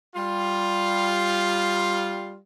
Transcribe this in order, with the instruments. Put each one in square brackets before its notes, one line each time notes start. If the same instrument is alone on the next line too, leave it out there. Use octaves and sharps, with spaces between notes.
[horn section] G3 F4